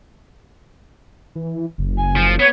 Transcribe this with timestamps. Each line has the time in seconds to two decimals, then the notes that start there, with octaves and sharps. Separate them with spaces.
1.36 E3
1.78 F#1
1.97 G#5
2.17 F3
2.40 B3 C#5